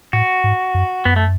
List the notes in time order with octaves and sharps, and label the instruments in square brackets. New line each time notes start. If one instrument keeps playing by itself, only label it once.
[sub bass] A2 [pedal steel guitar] F#4
[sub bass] G#2
F#2
[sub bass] F#2 [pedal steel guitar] B3
[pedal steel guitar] A3